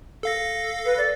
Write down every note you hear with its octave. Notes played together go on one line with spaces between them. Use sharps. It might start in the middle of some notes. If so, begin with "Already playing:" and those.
A4 F5 A#6
B4
D5